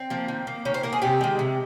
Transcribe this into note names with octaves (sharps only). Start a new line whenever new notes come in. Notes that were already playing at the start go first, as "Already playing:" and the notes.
Already playing: C4
F3 A#3
D#3
A#3
D#3 C#4
C5
A#3 A#4
G#4
C3 G4
D#3 G#3
C3